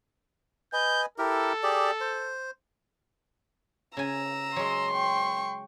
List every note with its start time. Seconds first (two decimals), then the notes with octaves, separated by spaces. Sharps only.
0.73 B4 D#5 G#5 G6
1.18 E4 G4 A4 A#4
1.63 G4 G#4 D5
2.00 C5
3.97 C#3 G#5 A#5 E6
4.56 F#3 G#3 C6
4.92 G5 C#6